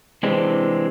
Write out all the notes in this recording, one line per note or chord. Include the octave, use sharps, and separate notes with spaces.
C3 E3 G#3 C4 D4